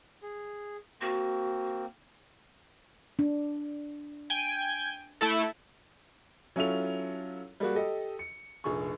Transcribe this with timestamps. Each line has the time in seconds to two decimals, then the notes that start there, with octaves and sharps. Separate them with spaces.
0.23 G#4
1.01 A#3 C4 F#4
3.19 D4
4.30 G5 G#5
5.21 A3 E4 A4
6.56 F#3 C#4 E4 F4 A4 F7
7.60 G3 G#3 A#3 F#4
7.76 G4 A4 D#5
8.19 C#7
8.64 F1 A#1 G#4 C#6